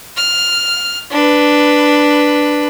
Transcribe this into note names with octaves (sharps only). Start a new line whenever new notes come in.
F6
D4 B4